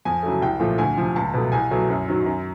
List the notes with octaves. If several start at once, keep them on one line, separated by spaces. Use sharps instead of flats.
F2 G#5
C#3 F#3 A3
C2 G5
A#2 F3 A3
D2 G#5
C3 F3
C#2 A5
B2 F#3 A3
C2 G#5
B2 F#3 A3
F#2
D#3 F#3
F#2